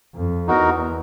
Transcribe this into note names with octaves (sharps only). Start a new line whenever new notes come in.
F2
E2 D#4 F#4 A#4